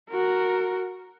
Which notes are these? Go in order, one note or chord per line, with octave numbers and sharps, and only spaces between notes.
F#4 A#4